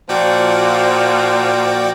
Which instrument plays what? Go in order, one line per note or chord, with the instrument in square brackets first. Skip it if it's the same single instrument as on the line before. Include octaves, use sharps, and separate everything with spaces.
[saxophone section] A#2 F3 [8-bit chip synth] F#4 D5 G5